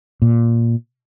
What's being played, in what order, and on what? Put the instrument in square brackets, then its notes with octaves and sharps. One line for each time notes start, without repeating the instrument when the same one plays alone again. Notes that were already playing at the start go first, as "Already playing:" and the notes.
[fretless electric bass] A#2